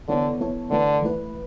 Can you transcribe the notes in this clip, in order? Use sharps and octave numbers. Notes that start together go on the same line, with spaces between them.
D3 E3 B3 E4 A4 C#5
E3 B3 E4 A4 C#5
D3 E3 A3 E4 B4
E3 A3 E4 B4